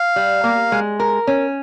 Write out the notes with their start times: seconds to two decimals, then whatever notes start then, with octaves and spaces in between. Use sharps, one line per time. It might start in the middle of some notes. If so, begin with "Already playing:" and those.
Already playing: F5
0.16 G3
0.44 A#3
0.72 G#3
1.00 A#4
1.27 C#4